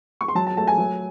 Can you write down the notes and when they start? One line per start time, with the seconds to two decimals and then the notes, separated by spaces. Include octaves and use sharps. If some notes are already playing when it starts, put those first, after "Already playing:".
0.21 C#6
0.28 C6
0.35 F#3 A5
0.47 A5
0.57 A3 A5
0.67 G#5
0.78 F#3